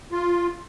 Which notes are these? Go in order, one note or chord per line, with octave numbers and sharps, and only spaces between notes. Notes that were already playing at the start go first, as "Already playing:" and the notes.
F4